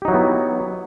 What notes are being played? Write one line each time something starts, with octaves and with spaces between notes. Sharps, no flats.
F#3 B3 D#4 E4 G4